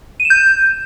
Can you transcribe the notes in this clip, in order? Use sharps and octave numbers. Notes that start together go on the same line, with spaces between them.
D#7
E7
G6